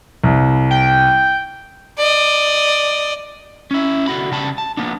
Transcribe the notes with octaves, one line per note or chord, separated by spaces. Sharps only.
C2
G5
D5 D#5
C#4 E4
D3 F#4 B5
C#3 G3 A5 B5
A5
A#3 B3 D4